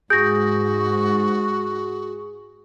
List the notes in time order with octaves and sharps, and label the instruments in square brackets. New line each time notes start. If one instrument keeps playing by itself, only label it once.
[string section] G#2 [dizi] F#4 [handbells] G#4 [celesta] G6 A#6